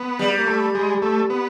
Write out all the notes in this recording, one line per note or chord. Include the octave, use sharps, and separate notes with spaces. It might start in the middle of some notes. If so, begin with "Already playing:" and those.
Already playing: B3
G3
A#3
A3
G#3
A3
B3